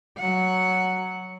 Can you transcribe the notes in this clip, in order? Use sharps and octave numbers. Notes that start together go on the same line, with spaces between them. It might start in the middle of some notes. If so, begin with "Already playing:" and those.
F#3 F#5